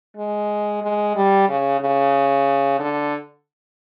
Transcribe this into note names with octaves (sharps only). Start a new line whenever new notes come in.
G#3
G#3
G3
C#3
C#3
D3